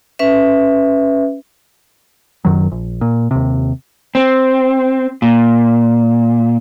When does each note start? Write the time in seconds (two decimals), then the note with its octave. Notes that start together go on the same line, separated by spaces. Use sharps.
0.19 C#4 B4 E5
2.45 F#1 F#2 D#3 F#3
2.72 A#1
3.01 A#2
3.31 D#2 C3
4.15 C4
5.22 A#2